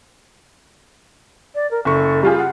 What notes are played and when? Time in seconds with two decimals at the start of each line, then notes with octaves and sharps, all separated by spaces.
1.55 D5
1.71 A#4
1.85 F#1 A4 C#6
2.23 G3 F4 G4 G#4
2.38 F#5